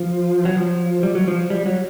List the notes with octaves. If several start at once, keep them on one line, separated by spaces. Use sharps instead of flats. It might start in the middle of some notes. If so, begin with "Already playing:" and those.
Already playing: F3
F#3
F3
G3
F#3
F3
G3
F#3